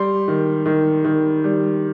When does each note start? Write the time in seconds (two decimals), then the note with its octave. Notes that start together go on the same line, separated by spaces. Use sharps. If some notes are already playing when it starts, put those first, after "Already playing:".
Already playing: G3 C6
0.28 D#3
0.66 D#3
1.05 D#3
1.44 G3